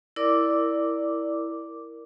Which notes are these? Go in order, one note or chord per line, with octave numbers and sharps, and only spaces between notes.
E4 A#4 D5 D6